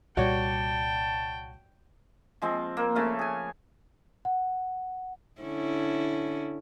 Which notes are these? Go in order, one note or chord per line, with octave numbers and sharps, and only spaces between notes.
C2 A#2 G3 F#4 C#5 D5 G5 A5
F3 G#3 C4
A#3
C#3 A3 F5
G#4 G#5
F#5
D3 C#4 E4